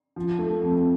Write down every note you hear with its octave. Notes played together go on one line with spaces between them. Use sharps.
F3
A3
F2